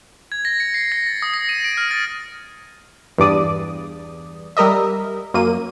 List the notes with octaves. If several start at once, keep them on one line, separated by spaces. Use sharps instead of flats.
G#6
A#6
C#7
C7
A#6
A6
D#6
A#6
D#7
D7
F6
A6
E2 G2 D5 D#6
G3 A#4 D#5 E5
F#2 A#3 D#7